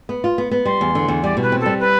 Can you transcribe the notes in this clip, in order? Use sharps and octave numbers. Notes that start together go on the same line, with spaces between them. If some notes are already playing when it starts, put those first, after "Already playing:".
B3
F4
B3
B3
G3 C6
E2
D3
E2
G3 D5
B2
B4
C4
A4
G3
B4